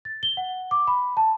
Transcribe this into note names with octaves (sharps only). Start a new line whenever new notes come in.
A6
G7
F#5
D6
B5
A5